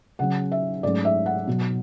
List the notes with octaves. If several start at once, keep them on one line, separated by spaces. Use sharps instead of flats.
C#3 F#3 C#4 F#5
E5
G#2 F#3 A3 C#4 D5
E5
F#5
B2 F#3 B3